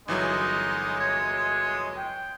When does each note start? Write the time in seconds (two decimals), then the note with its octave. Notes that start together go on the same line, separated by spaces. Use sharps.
0.08 G1 E3 F#3 G#3 D#4
1.00 C#5
1.97 G5